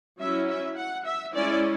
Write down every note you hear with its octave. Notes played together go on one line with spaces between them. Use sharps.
F#3 C#4 E4 E5
E5
F#5
E5
G#3 C#4 E4 D5